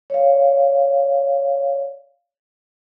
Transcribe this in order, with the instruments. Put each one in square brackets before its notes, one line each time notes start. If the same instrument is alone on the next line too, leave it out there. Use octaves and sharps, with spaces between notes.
[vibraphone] C#5 D5 F5